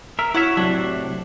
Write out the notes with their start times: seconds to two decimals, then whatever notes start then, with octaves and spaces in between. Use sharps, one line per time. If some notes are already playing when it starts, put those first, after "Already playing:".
0.19 A#4 E5
0.35 E4 F#4 C#5 E5
0.57 A2 C3 F#3 D4